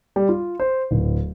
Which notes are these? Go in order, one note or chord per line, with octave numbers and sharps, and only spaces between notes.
G3
F4
C5
D1